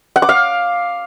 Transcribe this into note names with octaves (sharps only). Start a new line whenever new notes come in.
F#5
D6
F5